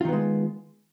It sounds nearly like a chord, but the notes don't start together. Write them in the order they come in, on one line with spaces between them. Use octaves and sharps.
F4 D#3 B3 G#3